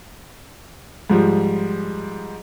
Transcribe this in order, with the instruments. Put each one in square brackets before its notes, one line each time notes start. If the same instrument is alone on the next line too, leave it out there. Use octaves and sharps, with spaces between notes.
[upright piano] G#2 F3 G3